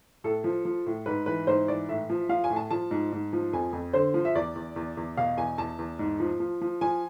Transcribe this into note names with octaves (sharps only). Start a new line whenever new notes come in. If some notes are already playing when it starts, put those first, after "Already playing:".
A2 A4
F3
F3
A2
G#2 B4
E3 B4
G#2 C5
E3 D5
A2 E5
F3
F3 F5
G#5
A2
A5
F3 A5
G#2
G#2
F3
F2 G#5
F2
D3 C5
F3
E5
E2 D5
E2
E2
E2
B2 F5
E2 G#5
E2 A5
E2
G#2
F3
F3
F3
F3 G#5